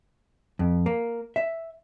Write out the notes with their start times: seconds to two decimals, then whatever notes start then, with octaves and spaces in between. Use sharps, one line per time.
0.59 F2
0.86 A#3
1.36 E5